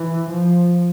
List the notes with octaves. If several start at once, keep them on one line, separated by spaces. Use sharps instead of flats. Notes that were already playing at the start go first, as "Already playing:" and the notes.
Already playing: E3
F3